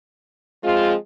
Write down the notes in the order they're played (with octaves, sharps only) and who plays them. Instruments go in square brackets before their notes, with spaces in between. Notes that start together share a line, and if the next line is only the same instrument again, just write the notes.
[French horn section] F3 C4 F4 [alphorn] G#3